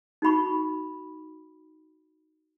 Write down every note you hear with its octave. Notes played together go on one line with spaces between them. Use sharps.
D#4 F#4 B5 C#6